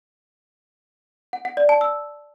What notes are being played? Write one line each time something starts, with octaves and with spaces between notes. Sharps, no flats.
F#5
F#5
D5
A5
E6